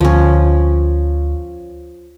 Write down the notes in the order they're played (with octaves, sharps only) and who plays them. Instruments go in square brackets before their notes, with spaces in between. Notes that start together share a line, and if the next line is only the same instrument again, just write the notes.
[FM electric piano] D2 [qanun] F3 C#4